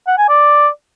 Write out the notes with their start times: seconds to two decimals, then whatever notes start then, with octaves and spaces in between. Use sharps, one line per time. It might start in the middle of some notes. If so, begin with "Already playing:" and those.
0.08 F#5
0.18 G#5
0.29 D5